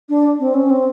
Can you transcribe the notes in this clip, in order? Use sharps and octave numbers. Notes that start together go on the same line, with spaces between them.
D4
C4
C#4
C4